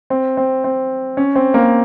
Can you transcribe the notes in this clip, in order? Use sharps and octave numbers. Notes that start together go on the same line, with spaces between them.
C4
C4
C4
C#4
C4
A#3